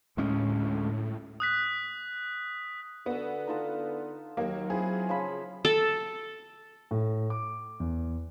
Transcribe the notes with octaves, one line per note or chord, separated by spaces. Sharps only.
D2 A2 G#3 C#4
D#6 F#6 B6
D3 B3 F#4 E6
D#4 F4 A4
D#2 F#3 A#3 D#4 A#4
C4 E4 F4 G#4
C#3 F3 E4 B5
A4
A2
D6
E2